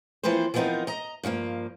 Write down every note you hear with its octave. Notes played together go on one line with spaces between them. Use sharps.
E3 F3 A#3 C4 B4 C5
E3 F3 B3 C4 D#4 A#4
D#5 A#5
G2 F3 G3 A#3